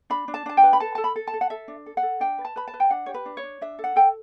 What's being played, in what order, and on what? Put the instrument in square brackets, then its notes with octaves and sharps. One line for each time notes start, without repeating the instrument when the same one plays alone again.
[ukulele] D4 B5
D4
A5
D4 A5
G5
B4
B5
A4 A5
A4 A5
B5
A4
A5
A4
F#5
A4 E5
D4
A4
F#5
A4
D4 G5
B4
A5
B4 B5
A5
B4
G5
D4 F#5
G4 C#5
B4
D4
C#5
D4
D4 E5
A4
F#5
A4 G5